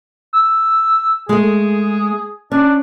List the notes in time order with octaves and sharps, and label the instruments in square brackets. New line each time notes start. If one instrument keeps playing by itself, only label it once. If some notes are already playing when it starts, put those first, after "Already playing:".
[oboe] E6
[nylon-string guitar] G#3 A3 [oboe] G#4
[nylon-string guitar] C#4 [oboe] D4